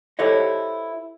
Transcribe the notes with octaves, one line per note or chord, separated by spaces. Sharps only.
E4 G4 A4 C5 C#5 D#5